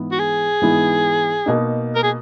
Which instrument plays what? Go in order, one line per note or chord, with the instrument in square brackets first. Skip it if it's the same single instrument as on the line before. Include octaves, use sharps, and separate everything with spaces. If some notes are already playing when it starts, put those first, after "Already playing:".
Already playing: [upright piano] G#2 E3 B3 E4
[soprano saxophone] F#4
G#4
[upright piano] G#2 E3 B3 E4
B2 A#3 D#4
[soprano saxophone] A#4
G#4